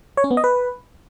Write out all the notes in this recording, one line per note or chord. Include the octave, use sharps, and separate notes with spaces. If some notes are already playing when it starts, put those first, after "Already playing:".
C#5
C#4
B3
D#5
B4